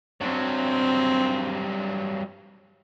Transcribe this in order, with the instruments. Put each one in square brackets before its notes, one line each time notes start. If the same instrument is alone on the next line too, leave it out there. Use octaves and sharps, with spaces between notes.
[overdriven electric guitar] G2 F#3 [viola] C4